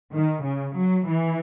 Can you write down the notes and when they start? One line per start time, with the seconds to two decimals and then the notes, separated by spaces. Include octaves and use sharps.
0.13 D#3
0.44 C#3
0.76 F#3
1.07 E3